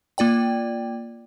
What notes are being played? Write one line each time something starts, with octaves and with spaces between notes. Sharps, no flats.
A#3 F4 D5 G5